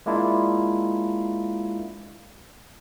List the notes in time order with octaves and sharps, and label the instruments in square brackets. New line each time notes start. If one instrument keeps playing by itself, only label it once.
[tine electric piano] G#3 A#3 D4 E4 F4